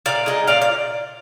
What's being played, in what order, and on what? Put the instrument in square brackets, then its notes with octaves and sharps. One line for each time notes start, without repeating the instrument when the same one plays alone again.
[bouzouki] A#2 D5 F5
G#3 D#4
A#2 D5 F5
D5